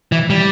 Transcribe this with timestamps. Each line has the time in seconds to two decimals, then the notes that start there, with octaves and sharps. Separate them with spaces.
0.12 E3
0.30 G3